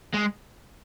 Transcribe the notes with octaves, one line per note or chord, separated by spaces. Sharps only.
G#3